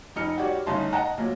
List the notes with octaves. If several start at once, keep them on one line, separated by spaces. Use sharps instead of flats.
F1 D#4 F6 C#7
F#4 G4 C#5 D5
G1 A2 C#3 D#4 A5 C6
D#5 F#5 A5 A#5 F#6
D2 A#2 F#3